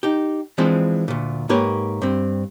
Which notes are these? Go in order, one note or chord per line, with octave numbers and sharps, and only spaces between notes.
D#4 G4
E3 F3 G#3 C4 D4
D2 A#2
G#2 A#3 G4 B4 C#5
G2 C4